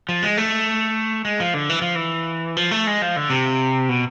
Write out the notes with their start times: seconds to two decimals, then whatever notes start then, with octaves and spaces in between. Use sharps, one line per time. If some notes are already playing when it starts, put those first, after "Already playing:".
0.09 F3
0.22 G#3
0.37 A3
1.25 G#3
1.40 F3
1.54 D3
1.69 E3
1.82 F3
1.95 E3
2.57 F3
2.71 A3
2.87 G#3
3.02 F3
3.16 D3
3.30 C3
3.89 B2